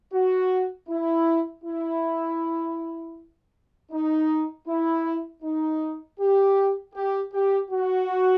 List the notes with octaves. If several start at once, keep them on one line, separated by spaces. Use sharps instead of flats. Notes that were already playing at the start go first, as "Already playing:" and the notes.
F#4
E4
E4
D#4
E4
D#4
G4
G4
G4
F#4